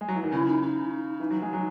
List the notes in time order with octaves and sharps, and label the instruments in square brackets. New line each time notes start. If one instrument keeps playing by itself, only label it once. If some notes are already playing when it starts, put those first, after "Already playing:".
[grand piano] G#3
F#3
E3
D#3
[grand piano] C#3 [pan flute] E4
[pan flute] D#4
D#4
[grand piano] E3
F#3
G#3
F#3